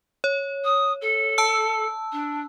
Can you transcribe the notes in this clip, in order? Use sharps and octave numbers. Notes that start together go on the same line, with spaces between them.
C#5
D#6
A4
A5 E6
D4